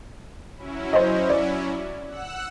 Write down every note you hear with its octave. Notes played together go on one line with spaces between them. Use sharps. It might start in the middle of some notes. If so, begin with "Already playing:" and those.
F#3 C#4 E4
C5 D#5
D5
F#5 E6 F#6